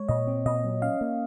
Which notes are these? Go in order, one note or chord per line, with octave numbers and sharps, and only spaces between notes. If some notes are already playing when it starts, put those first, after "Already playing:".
Already playing: G#3 C#5
A#2 D#5
C4
A#2 D#5
F#3
C#4 F5
A#3